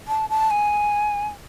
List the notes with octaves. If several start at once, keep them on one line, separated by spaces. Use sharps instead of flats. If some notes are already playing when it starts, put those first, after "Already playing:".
A5
A5
G#5